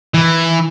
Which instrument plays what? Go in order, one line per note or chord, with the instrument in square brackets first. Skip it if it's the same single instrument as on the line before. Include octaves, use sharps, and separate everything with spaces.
[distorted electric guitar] E3